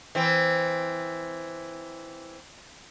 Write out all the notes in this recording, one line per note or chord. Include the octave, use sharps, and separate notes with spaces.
E3 C4